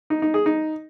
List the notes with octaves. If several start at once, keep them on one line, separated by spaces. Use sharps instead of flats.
D#4
D#4
G#4
D#4